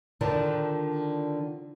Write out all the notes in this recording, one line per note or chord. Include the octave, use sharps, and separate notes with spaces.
D3 D#3 F3 D4 A4 A#4